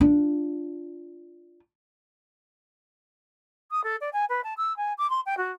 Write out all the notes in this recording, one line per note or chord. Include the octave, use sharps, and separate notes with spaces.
D4 F4
D#6
A4
D5
G#5
B4
A5
E6
G#5
D6
C6
G5
F#4